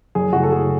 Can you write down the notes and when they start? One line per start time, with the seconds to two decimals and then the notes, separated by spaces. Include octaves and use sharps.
0.15 F#1 G#4
0.33 F#2 C#3 E3 A3 F#4
0.43 A4
0.52 F#1 G#4